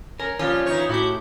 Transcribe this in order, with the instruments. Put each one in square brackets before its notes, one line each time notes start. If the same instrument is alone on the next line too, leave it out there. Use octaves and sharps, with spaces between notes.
[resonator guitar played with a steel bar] C#4 [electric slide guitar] A#4
[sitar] A#2 F3 G3 [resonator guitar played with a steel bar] C#4 [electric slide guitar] F4
[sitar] E3 D#4 C#5
[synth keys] A2 G4 G6 [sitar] E4 [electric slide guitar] F#4